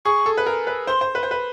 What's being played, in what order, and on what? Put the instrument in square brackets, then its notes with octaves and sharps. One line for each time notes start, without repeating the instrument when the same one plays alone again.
[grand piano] G#4 [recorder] C#6
[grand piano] A4
B4
A#4
B4
[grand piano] C5 [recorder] C6
[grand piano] C5
B4
C5
B4